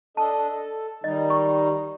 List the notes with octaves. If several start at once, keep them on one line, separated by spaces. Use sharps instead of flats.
D4 A4 D#5 A5
A4
D#3 G3 D#4 D#5
C#6